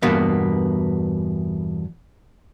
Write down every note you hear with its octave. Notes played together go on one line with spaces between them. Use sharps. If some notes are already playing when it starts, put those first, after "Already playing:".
E2 G2 B2 A#3 B3